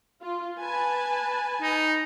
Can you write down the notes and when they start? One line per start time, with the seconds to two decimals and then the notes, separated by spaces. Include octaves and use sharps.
0.22 F4
0.59 B4 G#5 A5
1.62 D#4